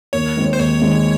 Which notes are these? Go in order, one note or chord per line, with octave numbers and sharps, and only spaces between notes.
D#2 C#5
D#3 G#3 C4
C5
D#2 C#5
D#3 G#3 C4